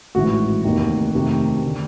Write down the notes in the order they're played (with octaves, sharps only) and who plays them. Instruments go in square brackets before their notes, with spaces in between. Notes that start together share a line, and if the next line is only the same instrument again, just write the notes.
[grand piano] A1 G#2 E3 F#4
F1 D#2 D#3
D2 C3 D#3
D3